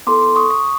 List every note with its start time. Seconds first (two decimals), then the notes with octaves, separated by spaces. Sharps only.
0.07 B3 E4 A4 C6 D6
0.36 C#6 D#6
0.51 C#6 D#6